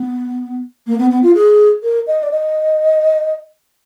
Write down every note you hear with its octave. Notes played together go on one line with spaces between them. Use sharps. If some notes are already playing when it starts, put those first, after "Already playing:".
Already playing: B3
A#3
B3
B3
F4
G#4
A#4
D#5
D5
D#5